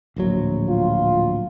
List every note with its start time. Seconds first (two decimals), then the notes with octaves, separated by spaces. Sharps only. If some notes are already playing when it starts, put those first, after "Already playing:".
0.16 D1 A#1 F#3
0.69 F4